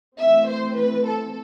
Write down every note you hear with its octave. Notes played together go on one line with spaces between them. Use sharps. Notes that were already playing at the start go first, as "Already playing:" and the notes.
E3 A3 C4 E5
C5
B4
A4